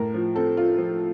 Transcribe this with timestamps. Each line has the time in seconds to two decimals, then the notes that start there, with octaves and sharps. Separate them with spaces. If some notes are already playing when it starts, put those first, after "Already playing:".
Already playing: A2 A#4
0.14 F3
0.35 C4 A4
0.57 F4
0.78 F3